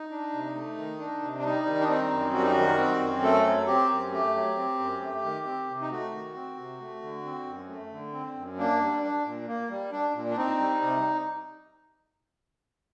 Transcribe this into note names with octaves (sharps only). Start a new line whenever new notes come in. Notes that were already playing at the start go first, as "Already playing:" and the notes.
Already playing: D#4
D4
C3
A3
D#3
D4
C3
D4
G3 D#4
D#3
D4
C4 D#4
F#2
G3 F#4
D#4
D#3 F#4
C4
F#2
A3 A4
F#3
C4 G4
F#2
A3 G4
F#3
C4
F#2
A3
D#3
C4
C3
D#4
A3 F#4
D#3
C4
C3
A3
D3
C4
F#2
A3
D3
C4
F#2
A#3 D4
G3
D4
A#2
A#3
G3
D4
A#2
D4
C4 D#4
G3
C3